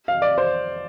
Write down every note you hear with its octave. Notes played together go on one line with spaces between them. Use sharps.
F5
D5
C5